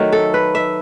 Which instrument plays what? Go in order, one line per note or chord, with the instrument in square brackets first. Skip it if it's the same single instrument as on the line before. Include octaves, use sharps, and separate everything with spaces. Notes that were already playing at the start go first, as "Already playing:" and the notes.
Already playing: [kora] D#3 F#3 A3
A4
B4
E5